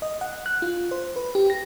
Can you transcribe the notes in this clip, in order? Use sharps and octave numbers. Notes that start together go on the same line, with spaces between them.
D#5
F#5
F#6
F4
C5
B4
G4
A#6